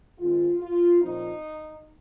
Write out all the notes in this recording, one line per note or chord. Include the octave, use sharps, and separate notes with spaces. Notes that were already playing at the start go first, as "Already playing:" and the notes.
G#2 D#3 G#3 C4 F4
F4
A#2 F3 C4 D#4